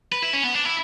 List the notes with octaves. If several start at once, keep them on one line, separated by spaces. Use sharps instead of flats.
B4
E4
C#4
B3
D4
E4